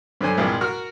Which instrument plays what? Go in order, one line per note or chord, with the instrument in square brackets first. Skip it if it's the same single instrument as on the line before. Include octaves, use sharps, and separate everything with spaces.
[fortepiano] G2 D3 F#3 C5 G#5
C2 G2 A#2 F3 G#3 A#3
F#4 A#4 F6